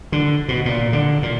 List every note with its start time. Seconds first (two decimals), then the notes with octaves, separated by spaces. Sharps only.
0.12 D3
0.49 B2
0.66 A#2
0.93 D3
1.23 A#2